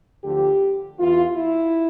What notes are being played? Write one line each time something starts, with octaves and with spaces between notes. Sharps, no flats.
D2 D3 F3 G4
E2 E3 F4
E4